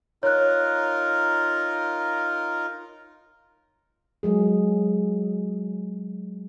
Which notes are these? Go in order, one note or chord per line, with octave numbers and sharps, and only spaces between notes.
D#4 F4 A#4 C#5 F#6
F#3 G#3 G#4